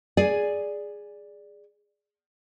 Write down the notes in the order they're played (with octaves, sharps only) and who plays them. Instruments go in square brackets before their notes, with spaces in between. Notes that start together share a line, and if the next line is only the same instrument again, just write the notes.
[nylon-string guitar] G#4 D5 G#5